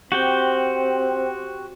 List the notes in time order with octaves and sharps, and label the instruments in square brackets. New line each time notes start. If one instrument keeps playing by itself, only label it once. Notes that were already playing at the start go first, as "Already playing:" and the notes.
[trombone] C4 [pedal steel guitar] F#4 G4 G5